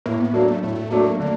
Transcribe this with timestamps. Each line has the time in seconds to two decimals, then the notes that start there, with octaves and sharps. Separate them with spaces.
0.06 A2 A#3
0.20 B3
0.33 F#3 A3 A#3 D4
0.48 A3
0.63 A2 A3
0.90 F#3 A3 A#3 D4
1.20 D3 A#3